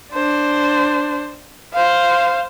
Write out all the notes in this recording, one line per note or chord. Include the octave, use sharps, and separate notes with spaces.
D4 C5
C5 F5